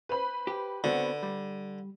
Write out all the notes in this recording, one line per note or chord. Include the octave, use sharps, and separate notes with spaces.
B4 C5 B5
G4
D3 B3 C4 F#4
G3